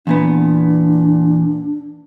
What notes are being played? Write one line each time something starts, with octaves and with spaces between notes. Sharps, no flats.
E2 A#2 B3 D4